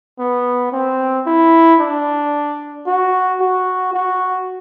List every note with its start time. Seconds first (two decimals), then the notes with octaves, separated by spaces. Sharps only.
0.19 B3
0.72 C4
1.26 E4
1.80 D4
2.86 F#4
3.40 F#4
3.93 F#4